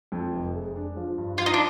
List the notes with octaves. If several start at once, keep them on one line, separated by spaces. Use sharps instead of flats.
F2
F1
G#3
D4
F3
G2
F3 F4
D#4
D4